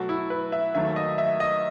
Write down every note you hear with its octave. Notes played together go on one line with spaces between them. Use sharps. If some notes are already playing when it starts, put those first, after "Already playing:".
Already playing: B2 F#3 A3 F#4
E4
B4
E5
D#2 D#3 F#3 A3 E5
D#5
E5
D#5